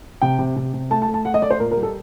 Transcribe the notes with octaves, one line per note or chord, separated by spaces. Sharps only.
C3 G5
C3
C3
C3
A3 A5
A5
A3
A5
A3 F#5
D#5
A3 D5
C5
A#2 A#4
A#4
G3
A4